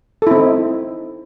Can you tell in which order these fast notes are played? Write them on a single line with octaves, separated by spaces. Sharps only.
A4 E4 C4 D#4